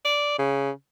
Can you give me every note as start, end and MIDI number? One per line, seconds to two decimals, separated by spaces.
0.05 0.35 74
0.39 0.71 49